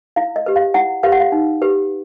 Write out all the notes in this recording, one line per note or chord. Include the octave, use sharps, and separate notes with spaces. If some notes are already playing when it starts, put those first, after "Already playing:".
E4 F5
D#5
G4 B4
F5
E4 F#5
G4 B4 F5
F#5
F5
D#4
G4 B4